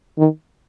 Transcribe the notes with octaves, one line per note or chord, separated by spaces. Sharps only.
D#3